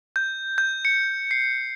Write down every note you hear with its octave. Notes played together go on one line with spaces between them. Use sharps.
G6
G6
C#7
C7